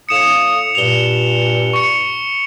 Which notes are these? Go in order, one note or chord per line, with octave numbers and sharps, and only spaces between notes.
A2 F5 D#6 C#7 E7 F7
G2 A#2 F7 G7
C#6 C#7